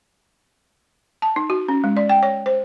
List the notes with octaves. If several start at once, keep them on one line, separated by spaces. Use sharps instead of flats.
A5
D#4
F#4
C#4
G#3
D5
G5
C#5
C5